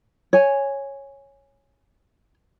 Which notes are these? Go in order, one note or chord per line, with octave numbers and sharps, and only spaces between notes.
C#5 G#5